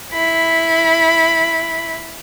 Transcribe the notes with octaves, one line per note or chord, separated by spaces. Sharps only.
E4 B5